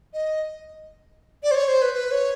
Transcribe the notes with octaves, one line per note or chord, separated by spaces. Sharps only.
D#5
D5
C5
C#5
C5
B4
B4
C#5